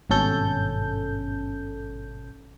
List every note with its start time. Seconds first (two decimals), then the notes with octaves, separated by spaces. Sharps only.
0.10 G#1 G2 B2 C#4 A4 G6